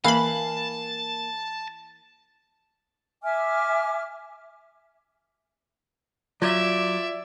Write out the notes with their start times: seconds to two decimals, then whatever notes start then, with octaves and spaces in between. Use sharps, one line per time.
0.04 E3 A#3 F5 A5 B5
3.23 E5 G#5 D6 F6
6.42 F#3 F4 D5 E5 G#6